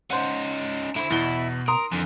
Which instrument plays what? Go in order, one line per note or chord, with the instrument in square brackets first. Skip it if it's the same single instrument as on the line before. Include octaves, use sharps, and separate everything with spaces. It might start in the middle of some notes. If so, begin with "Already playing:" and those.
[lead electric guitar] C#4 D#4 [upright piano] C5 F#5
[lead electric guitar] D3 C5 [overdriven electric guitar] E4
[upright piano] E2 G7 [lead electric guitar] B2
[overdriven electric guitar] A#4 [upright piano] A#5 C6 D#6
[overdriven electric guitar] F2 [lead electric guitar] D3 E3